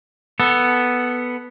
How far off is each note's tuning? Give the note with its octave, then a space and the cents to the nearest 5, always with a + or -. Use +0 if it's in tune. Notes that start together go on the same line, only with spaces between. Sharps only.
B3 +0 A4 +0